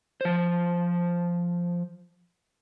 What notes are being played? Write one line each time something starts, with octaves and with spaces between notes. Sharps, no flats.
F3 C5